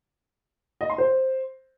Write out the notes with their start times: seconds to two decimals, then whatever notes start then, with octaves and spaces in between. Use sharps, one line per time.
0.81 D#5
0.89 C6
0.98 C5